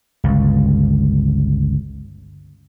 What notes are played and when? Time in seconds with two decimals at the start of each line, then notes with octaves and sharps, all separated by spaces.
0.24 G1 C#2